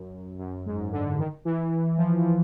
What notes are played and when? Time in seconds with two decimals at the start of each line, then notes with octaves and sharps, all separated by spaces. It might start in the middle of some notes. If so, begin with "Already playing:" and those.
Already playing: F#2
0.39 F#2
0.66 G#2
0.92 D3
1.19 D#3
1.45 E3
1.98 F3